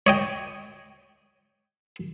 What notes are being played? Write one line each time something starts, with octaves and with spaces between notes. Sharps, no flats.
C#5 D#5 G5